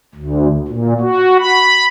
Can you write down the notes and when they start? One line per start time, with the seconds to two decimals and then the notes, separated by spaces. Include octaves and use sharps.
0.15 D2
0.68 A#2
1.00 F#4
1.39 B5